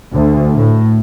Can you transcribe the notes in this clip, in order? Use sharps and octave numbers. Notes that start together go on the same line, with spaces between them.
D2
A2